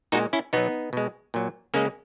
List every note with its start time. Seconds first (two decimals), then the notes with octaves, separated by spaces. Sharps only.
0.12 A#2 G#3 D#4 F#4
0.33 C#4 E4
0.53 B2 F#3 B3 D#4
0.93 B2 G#3
1.34 A#2 F#3
1.74 C#3 G#3 A#3 C#4